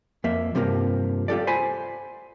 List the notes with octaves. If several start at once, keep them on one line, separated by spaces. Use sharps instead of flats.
F2 A#3 E5
G2 C3 F3 A#3
F4 G4 A4 D5
C5 G#5 B5